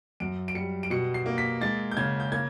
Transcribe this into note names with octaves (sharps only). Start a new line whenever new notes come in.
F#2 D7
D7
G3 C#7
D7
B2 C#7
C7
A#3
B6
G#3 A6
G6
C#3 G#6
G6
A#3 G#6